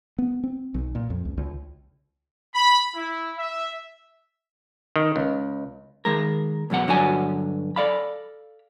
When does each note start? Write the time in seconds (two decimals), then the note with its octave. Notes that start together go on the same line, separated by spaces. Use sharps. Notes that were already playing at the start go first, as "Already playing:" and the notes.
0.18 B3
0.44 C4
0.74 B1
0.95 A#2
1.10 F2
1.25 C#2
1.37 C#2
2.54 B5
2.95 E4
3.38 E5
4.96 D#3
5.16 C#2
6.05 D#3 G#3 A#4
6.70 C#2 F#2 B2 F#5
6.87 G2 D3 F#3 F#4 F#5 G#5
7.76 A4 D5 F5 B5